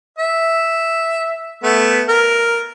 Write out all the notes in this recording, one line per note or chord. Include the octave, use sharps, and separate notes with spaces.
E5
A3 B3
A#4